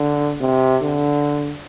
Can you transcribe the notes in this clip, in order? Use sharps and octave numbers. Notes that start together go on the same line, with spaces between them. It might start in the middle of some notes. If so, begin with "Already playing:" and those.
Already playing: D3
C3
D3